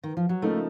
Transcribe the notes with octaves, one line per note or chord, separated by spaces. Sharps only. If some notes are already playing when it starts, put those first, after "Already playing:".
D#3
F3
F#3
C#3 F3 A3 A#3 D#4 A4